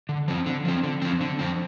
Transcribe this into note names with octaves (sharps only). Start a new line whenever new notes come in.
D3
F3 C4
D3
F3 C4
D3
F3 C4
D3
F3 C4